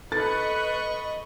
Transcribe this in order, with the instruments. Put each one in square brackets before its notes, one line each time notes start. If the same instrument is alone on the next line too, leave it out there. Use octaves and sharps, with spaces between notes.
[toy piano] A4 [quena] B4 [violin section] D#5 B5 C#6 [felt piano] A6